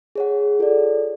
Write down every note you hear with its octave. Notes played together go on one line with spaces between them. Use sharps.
G#4 C#5 F#5
F4 A4 D5